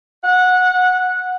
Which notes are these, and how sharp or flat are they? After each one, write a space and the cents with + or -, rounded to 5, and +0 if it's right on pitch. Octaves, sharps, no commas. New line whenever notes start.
F#5 -15